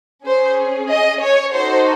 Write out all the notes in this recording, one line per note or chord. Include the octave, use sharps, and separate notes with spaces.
C#4 G#4 C5
D#5
C#5
D#4 F#4 A4 C5